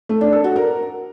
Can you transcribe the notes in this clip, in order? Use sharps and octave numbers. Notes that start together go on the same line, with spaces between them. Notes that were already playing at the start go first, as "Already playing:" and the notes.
A3
D4
A4
F#4
A#4